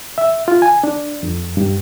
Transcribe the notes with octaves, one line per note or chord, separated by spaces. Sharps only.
E5
F4
G#5
D4
F2
G2